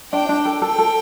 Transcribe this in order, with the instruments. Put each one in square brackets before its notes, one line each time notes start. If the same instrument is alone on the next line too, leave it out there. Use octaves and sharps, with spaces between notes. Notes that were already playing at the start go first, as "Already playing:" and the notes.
[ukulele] D4 [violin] G5
[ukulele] D4
A4
[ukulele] A4 [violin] G5
[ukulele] A4